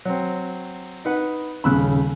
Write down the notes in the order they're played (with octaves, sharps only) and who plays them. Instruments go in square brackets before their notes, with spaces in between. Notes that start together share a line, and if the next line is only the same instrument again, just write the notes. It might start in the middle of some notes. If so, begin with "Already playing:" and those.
[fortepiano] F#3 C4
D#4 B4 F#5
[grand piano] D#1 C#3 [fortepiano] B5 E6 F#6